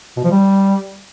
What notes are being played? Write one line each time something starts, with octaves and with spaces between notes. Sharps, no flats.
B2
F3
G3